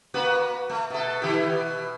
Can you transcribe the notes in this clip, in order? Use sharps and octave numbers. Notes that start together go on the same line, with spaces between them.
A#3 F#4 B4
A3
B2 A4
D#3 E4 G4
B2